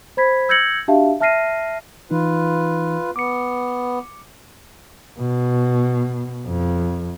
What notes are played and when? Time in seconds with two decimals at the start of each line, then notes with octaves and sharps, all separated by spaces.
0.17 C5 B5 G#6 B6
0.49 E6 G6 G#6 A#6 C#7 F#7
0.88 D4 F#4 G4 E5 F5 A5
1.20 E5 A5 F6 A#6 C7 D#7
2.11 E3 D#4 F4 B4
3.16 B3 D6 C#7
5.19 B2
6.46 F2